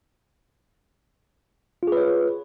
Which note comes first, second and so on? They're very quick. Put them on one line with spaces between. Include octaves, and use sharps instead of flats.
F4 G#4 B4 C#5